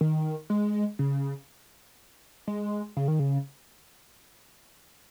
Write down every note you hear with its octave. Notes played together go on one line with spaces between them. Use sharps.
D#3
G#3
C#3
G#3
C#3
D#3
C#3